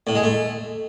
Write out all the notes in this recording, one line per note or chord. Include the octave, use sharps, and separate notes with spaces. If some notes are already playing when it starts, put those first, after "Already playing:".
A2
G#3
A3